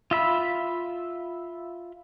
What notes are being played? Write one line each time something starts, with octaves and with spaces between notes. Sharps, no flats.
F4 E5 B5